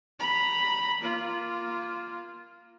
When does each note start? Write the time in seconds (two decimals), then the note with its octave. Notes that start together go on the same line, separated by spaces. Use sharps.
0.20 A#5 B5
1.00 A#3 F4